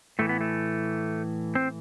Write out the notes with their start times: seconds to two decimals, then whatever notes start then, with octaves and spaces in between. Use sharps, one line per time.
0.19 A2 E3 A3
0.29 B3
0.41 A3
1.55 C4